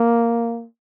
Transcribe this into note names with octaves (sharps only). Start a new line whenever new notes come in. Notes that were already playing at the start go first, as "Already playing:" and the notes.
Already playing: A#3